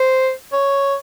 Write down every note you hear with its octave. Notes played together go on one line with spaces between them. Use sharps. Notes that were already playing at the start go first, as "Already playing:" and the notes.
Already playing: C5
C#5